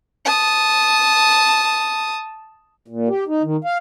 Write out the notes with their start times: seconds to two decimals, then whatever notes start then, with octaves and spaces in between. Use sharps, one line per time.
0.25 A5 D#6
2.88 A#2
3.08 G4
3.27 D#4
3.43 D#3
3.64 F5